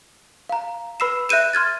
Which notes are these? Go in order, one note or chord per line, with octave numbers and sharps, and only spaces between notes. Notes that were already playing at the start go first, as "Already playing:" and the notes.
F5 A#5
B4 B5 E6 C7 E7
E5 F#6 G6 D#7 E7
C6 F6 G#6 A6